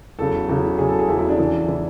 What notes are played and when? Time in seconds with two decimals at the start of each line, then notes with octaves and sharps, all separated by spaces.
0.19 E2 C#3 F#3 A4
0.49 E2 C#3 F#3
0.79 E2 C#3 F#3 G#4
0.89 A4
0.99 G#4
1.08 E2 C#3 F#3 E4
1.19 E4
1.29 D4
1.39 E2 C#3 E3
1.68 C#3 E3 E4